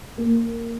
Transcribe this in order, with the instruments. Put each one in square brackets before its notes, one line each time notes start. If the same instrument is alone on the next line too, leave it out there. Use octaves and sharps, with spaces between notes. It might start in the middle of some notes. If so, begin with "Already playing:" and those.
[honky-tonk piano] A#3